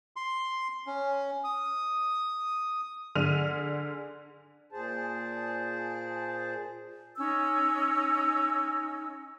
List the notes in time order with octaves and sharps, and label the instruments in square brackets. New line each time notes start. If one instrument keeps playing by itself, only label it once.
[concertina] C6
C#4
D#6
[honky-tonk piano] D3 G#4 F6 D#7 F7
[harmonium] A#2 G#4 C5 A5
[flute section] C#4 D#4 E6